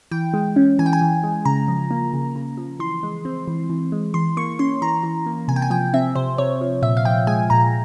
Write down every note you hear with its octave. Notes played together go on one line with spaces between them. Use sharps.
E3 G5
G#3
C#4
E3 G#5
G5
G#5
E3
G#3
C#3 A#5
F3
A#3
C#3
C#3
F3
E3 C6
G#3
C4
E3
E3
G#3
E3 C6
A#3 C#6
C#4 C6
E3 A#5
E3
A#3
C3 G#5
G5
G#5
F3 G5
C4 E5
C3 C5
C3 C#5
F3
A#2 E5
F5
F3 G5
G#3 G#5
A#2 A#5